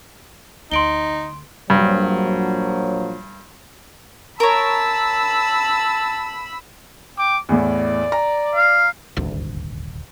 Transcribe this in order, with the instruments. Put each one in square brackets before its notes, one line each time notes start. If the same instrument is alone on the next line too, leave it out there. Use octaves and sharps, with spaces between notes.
[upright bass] D2 [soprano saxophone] D#4 [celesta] C6 D7 G7
[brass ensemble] A#1 F3 F#3 [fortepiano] G2
[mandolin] A#4 C#5 [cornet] A5 [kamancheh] B5 E6
[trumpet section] G5 D6
[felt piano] E2 A2 [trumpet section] D5
[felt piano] A#5
[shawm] F5
[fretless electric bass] D#1 G#1 D2